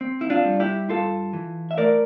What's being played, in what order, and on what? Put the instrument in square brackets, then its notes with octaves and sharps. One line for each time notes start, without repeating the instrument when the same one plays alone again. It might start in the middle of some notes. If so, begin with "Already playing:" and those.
[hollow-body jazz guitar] C4
E4
D4 F4
G3
E4 G4
G2 F4 A4
E3
E5
A3 A#4 D5